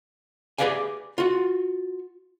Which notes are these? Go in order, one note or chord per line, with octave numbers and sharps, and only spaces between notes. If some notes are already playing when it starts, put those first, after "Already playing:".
G4 G#4 B4 D5 F5 G#5
F4 F#4